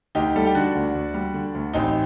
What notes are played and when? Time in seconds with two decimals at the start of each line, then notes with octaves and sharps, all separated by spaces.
0.15 D2 D#4 G4
0.35 G3 A4
0.45 G4
0.54 D3 D4 F#4
0.75 D2
0.94 D2
1.14 G3
1.34 D3
1.54 D2
1.73 A1 C4 D#4